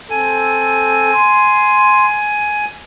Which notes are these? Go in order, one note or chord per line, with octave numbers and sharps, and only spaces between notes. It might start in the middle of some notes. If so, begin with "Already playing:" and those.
C4 A4 G#5
C6